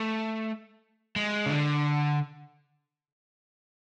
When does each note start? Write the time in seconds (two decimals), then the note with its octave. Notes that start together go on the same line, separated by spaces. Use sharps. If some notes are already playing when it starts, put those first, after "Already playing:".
Already playing: A3
1.16 G#3
1.46 C#3
1.50 D3